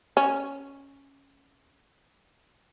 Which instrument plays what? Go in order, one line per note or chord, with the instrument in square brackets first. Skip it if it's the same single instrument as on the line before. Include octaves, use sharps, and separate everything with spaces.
[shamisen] C#4